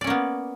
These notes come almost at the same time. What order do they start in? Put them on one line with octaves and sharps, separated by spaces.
D5 C#4 A#3 B3